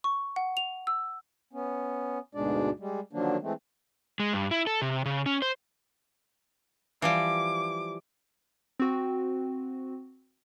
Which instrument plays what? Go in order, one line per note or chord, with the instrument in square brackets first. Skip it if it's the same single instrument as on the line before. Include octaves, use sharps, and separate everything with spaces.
[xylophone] C#6
F#5
F7
E6
[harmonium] B3 C#4
D2 G#2 B2 G#3 D4 D5
G3 G#3
D3 D#3 F3 F#3 A#3 D4
E3 G#3 A3 C4
[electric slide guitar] G#3
G2
E4
A4
C3
C#3
C#4
C5
[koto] E3 F3 G3 [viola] D6
[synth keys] C4 F#4